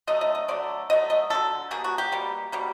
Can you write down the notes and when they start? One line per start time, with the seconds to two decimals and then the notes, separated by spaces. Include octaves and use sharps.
0.07 D3 F#3 A3 D#5
0.21 D#5
0.35 D#5
0.48 D3 F#3 A3 D5
0.90 D3 F#3 A3 D#5
1.10 D#5
1.30 D3 F#3 A3 A4
1.71 B2 G3 A#3 G#4
1.84 F#4
1.98 G4
2.12 B2 G3 A#3
2.52 B2 G3 A#3